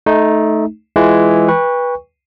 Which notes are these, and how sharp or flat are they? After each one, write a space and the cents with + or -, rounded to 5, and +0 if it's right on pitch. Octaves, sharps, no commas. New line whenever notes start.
A3 -15 D#4 +0
E3 +10 G#3 +0 F4 +0
B4 -15 G5 +40 C#6 +0